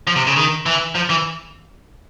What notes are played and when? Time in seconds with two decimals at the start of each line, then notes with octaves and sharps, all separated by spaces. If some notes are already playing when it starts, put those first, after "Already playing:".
0.07 F3
0.16 C3
0.27 C#3
0.36 D#3
0.66 E3
0.95 F3
1.10 E3